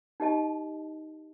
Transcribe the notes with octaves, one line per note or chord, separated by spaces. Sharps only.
D#4 G4 D#5 A5